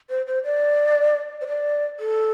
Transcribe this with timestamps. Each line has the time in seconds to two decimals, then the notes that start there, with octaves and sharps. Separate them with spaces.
0.10 C5
0.27 C5
0.44 D5
1.42 C5
1.48 D5
2.00 A4